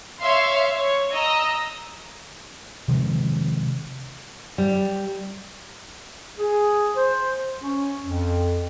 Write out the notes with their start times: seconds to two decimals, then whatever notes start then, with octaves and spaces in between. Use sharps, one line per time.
0.20 C#5 E5 F5 C6
0.73 C#5
1.12 D#5 A#5 E6
2.88 C3 D#3 F3 G#3
4.58 G3
6.38 G#4
6.95 C5
7.61 C#4
8.04 F2